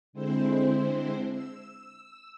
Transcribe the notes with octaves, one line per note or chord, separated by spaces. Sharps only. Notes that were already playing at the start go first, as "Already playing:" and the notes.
D3 G#3 C4 E4 C5
E6